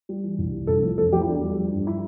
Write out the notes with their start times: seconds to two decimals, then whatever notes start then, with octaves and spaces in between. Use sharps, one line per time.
0.09 G3
0.24 E3
0.38 C2
0.53 G3
0.67 C2 A4
0.83 F3
0.98 F2 A4
1.12 F3 G4
1.21 E4
1.27 E2 D4
1.43 G3
1.57 F3
1.72 G2
1.87 E4